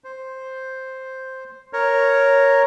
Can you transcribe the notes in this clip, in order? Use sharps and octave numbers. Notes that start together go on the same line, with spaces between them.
C5
A#4 C#5